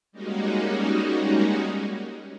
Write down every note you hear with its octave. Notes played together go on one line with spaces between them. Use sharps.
G3 G#3 A#3 C#4 D#4 F#4